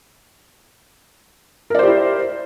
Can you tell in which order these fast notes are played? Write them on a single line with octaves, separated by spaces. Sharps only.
A#4 D5 C5 G4 E4